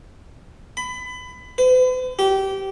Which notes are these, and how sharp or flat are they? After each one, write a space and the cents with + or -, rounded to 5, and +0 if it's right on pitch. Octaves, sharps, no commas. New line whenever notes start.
B5 +25
B4 +45
G4 -20